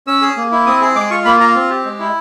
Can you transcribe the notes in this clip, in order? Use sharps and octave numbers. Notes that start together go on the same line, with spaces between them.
C#4 E6
G#4
A#3
E4
C4 D#6
G#4
G#3 D6
F4 C#6
A#3 B5
F4 A#5
C4
G4
G#3
E4